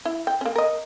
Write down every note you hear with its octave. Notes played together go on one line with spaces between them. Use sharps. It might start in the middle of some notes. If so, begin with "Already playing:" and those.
E4
G5
A#3 C#4
A#4 D#5